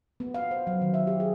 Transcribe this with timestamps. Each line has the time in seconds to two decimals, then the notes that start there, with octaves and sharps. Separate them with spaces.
0.20 B3
0.34 F5
0.51 C5
0.67 F#3
0.82 D#3
0.94 E5
1.07 G4
1.20 G#4